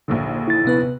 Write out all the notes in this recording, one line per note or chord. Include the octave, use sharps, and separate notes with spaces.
A#1 D#2 D3
E4 A6
C3 B3 B4